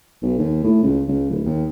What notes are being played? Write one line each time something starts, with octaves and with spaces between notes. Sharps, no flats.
B1
D#2
A2
C#2
C#2
D1
D#2